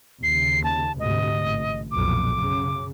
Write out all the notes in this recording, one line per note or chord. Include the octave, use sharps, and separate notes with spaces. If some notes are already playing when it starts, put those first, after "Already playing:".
D#2 C#3 C7
A5
D2 G#2 C3 D#5
A1
B1 F2 A#2 D6
F#2 C#3